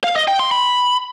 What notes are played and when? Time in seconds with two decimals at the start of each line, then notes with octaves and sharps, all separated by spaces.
0.04 F5
0.16 D#5
0.28 G5
0.39 C6
0.51 B5